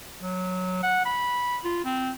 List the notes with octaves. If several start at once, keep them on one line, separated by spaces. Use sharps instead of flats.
F#3
F#5
B5
F4
C4